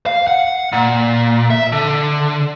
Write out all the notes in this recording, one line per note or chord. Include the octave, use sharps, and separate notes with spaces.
F5
F#5
A#2
E5
D3